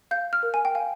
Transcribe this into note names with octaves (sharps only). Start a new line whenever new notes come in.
F5 G6
F6
A#4
G#5
G5
F5 G#5